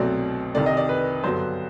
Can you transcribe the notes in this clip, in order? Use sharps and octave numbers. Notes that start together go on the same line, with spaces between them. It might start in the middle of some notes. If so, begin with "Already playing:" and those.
Already playing: C2 B2 F#3 A3 C4 D5
C2 C3 D#3 D5
D#5
D5
B4
G2 D3 F#3 B3 C5